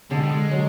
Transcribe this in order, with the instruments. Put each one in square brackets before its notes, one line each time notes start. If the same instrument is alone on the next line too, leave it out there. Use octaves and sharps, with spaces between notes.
[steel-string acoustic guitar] D3 [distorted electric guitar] G#3
[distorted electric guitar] G3
G#3
[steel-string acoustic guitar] F#3